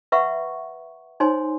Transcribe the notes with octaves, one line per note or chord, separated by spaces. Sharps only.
B4 E5 F#5 B5 C#6
D#4 C5 C#5 G#5 C6